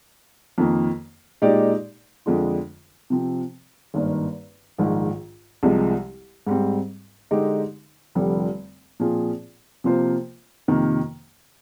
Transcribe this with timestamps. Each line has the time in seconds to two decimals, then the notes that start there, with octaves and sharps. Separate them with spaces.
0.58 F2 D#3 A#3
1.42 A#2 G#3 D#4 G4 D5
2.26 F2 D3 G#3 D4 F4
3.10 C3 F3 C4
3.94 G#1 G2 D#3 A#3
4.78 A#1 G#2 D#3
5.63 C2 C3 F3 G#3
6.47 G#2 G3 C4
7.31 D3 G#3 D#4 G4
8.15 F1 F2 D3 G3
9.00 A#2 F3 C4 F4 G#4
9.84 C3 F3 A#3 F4 C5
10.68 F2 C3 D#3 A#3